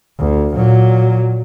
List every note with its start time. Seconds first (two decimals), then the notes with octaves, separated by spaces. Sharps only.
0.19 D2
0.56 A#2 F#3